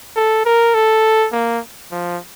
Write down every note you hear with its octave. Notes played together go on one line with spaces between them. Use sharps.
A4
A#4
A4
A#3
F3